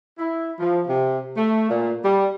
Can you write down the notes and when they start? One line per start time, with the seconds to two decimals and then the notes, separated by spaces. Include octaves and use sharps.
0.19 E4
0.59 F3
0.88 C3
1.37 A3
1.70 A#2
2.04 G3